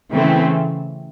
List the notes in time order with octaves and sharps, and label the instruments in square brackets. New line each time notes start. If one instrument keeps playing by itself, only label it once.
[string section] C#3 E3 A3 C4